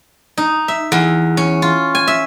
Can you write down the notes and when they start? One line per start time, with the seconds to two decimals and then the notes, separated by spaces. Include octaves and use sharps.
0.38 D#4
0.68 E5
0.92 E2
1.37 C#4
1.62 F4
1.95 G#5
2.07 E5